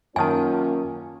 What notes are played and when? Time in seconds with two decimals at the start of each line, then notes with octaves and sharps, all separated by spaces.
0.16 F#2 D#3 A#3 C#4 F4 A#4 G#5 A5